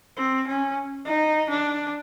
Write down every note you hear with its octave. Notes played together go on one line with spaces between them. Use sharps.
C4
C#4
D#4
D4